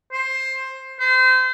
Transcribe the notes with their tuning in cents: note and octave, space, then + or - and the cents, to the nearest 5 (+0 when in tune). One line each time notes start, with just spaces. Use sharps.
C5 +15
C5 -30